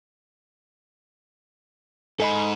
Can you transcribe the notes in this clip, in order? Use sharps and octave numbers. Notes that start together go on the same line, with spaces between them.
G#2 A4 D#5 B5